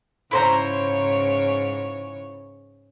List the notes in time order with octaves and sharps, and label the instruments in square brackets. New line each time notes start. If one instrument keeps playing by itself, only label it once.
[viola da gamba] G#2 C#3 C#5 [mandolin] E4 C5 A#5